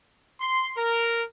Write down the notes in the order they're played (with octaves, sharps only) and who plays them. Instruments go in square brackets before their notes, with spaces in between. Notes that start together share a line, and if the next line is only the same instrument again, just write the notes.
[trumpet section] C6
A#4